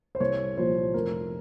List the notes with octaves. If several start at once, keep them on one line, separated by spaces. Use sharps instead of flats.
C5
C2 C#5
A#2 F3 C5
F1 A#4